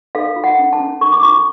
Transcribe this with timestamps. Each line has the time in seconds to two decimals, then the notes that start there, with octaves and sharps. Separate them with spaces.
0.15 A4 F5
0.36 F4
0.44 F#5
0.59 C#4
0.73 A5
0.80 C#4
1.01 A4 C#6
1.13 D6
1.23 F4 C#6